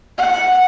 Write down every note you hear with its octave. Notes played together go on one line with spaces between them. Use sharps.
F#5